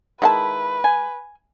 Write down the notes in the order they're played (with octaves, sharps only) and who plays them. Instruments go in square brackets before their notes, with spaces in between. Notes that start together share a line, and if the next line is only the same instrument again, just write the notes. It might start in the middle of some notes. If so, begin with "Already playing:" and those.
[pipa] D#3 E4 [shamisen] G#3 F#5 A5 [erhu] B4
[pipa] G#5